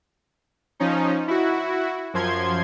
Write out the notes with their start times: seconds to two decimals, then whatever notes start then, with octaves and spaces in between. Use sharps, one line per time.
0.80 F3 C#4 D#4
1.28 E4 F#4
2.14 F#2 F3 C6 G#6